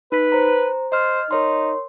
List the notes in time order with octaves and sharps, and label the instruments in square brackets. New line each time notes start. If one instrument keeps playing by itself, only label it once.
[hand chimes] D#4 B6 [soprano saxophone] B4
[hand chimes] C5 A#5
[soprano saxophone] C5 [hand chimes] D#5 F6
[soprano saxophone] D#4 [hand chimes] A#4 C#5 C6